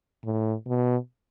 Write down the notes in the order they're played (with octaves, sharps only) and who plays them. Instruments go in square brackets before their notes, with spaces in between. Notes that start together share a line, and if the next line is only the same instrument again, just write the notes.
[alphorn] A2
B2